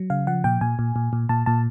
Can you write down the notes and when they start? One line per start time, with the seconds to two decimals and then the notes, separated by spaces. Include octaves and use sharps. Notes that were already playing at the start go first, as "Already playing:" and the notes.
Already playing: F#3
0.10 C#3 F5
0.27 F3 F#5
0.44 A#2 G5
0.61 A#2 G#5
0.79 A#2
0.96 A#2
1.13 A#2
1.29 A#2 A5
1.46 A#2 A5